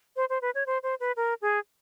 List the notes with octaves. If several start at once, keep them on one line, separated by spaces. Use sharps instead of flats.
C5
C5
B4
C#5
C5
C5
B4
A#4
G#4